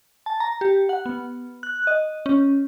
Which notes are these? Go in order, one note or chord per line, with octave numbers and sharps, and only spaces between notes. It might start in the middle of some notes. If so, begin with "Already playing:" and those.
A5
A#5
G4
F#5
B3
F#6
D#5
C#4